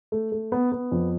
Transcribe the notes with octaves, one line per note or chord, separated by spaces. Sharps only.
A3
A3
B3
B3
F2